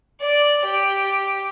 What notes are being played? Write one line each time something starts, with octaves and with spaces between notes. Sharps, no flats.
D5
G4